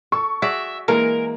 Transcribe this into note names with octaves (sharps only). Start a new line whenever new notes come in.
A4 C#6
F#4 G#4 D5 E5
E3 G#3 A#3 A#4